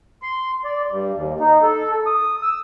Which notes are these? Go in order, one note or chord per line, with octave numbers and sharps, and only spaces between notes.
C6
D5
G2
D#2
D#4
A4
D#6
E6